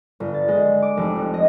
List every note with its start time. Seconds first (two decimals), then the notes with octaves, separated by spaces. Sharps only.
0.20 G1
0.34 A6
0.48 G#3
0.82 D6
0.97 F1
1.15 F2
1.34 D#5